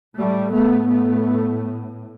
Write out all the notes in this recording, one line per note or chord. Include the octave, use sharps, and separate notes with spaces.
A2 G3 A3
A3 B3
A3 B3